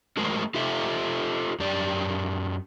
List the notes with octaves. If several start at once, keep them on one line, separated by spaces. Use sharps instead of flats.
F#3 G#3 A3 G#4 A#4 C5
F4 G4 A4 C5 E5
F#2 G4 D5